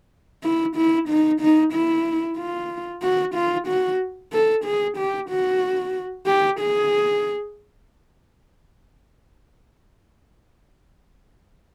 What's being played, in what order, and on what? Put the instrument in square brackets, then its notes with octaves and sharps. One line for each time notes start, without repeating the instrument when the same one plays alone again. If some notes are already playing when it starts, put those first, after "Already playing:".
[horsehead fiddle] E4
E4
D#4
D#4
E4
F4
F#4
F4
F#4
A4
G#4
G4
F#4
G4
G#4